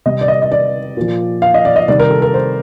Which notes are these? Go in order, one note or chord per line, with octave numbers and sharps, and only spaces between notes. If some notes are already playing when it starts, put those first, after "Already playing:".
C3 G3 D#5
D5
D#5
D#5
D5
A#2 F3
F5
D#5
D5
D#5
C3 D#3 G3 D5
A#4
A4
A#4
C5